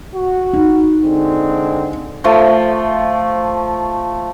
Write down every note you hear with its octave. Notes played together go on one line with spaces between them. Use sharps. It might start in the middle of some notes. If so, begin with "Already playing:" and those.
F#4
D#4
D3 G#3 C4
F3 A3